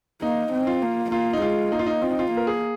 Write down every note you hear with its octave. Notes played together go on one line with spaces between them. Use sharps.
A#3 D#4
C4
F4
A#3
A#3 F4
D#4
G#3 F4
A#3 D#4
F4
D#4
C4 F4
D#4
F4
A#3
A#4
G#4